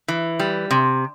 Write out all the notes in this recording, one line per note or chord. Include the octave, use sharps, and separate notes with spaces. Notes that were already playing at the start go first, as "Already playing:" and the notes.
E3
G3
C3